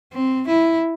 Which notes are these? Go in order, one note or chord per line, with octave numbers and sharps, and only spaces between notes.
C4
E4